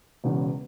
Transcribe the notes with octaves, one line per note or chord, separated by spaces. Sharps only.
E1 E2 C#3